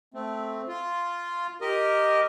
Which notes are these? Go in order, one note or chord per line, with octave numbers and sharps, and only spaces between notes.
A3 C4
F4
G4 A#4 D#5